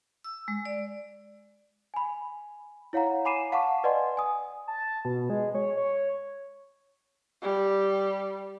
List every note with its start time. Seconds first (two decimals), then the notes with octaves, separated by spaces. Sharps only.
0.24 E6
0.48 G#3
0.65 D5
1.94 G#5 B5
2.93 E4 C#5 F5 F#5 A#5
3.25 G#5 B5 D6 C7 D#7 E7
3.52 F5 F#5 A5 C#6 D6
3.84 B4 D5 D#5 F#5 G#5 C6
4.17 G#5 D#6
4.68 A5
5.05 B2
5.30 G#3
5.55 C#5
5.77 C#5
7.42 G3